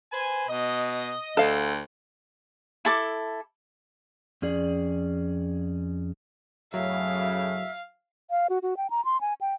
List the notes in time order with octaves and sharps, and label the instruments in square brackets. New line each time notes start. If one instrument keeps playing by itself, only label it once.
[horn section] B4 C5 G#5
[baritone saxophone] B2 [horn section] D#5
[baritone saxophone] D2 [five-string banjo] A4 F5
[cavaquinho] E4 A4 D6
[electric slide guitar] F2 C#4 G#4 D5
[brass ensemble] F#2 A2 C#3 [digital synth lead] F#3 [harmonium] E5 [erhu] F5
[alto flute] F5
F#4
F#4
G5
A#5
C6
G#5
G5